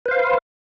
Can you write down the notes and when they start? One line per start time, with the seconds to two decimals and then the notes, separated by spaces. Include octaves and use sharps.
0.06 B4
0.08 C5
0.11 F5